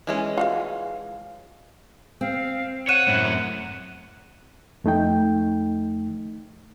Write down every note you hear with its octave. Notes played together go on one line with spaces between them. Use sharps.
E3 G#3 C#4
F4 F#4 F5
C4 F5
C#5 F#5 F#6 D#7 E7
F#2 A2
F2 A3 D#4 G5